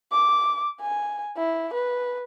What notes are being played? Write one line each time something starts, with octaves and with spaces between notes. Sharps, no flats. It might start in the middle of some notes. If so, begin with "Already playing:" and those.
D6
G#5
E4
B4